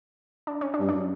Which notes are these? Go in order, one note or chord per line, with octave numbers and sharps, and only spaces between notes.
D4
C#4
D4
G2
F#2 D4